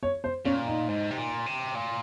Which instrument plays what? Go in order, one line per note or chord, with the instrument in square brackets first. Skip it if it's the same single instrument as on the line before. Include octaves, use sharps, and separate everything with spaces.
[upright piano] C#5
C5
[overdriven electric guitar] A#2 [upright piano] C#4
[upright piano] D#4
[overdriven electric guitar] G#2
C3
A#2
C3
A#2